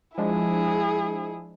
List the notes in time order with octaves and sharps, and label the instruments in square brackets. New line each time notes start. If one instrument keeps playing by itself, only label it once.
[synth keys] F3 G#3 D4 [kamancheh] E4 G#4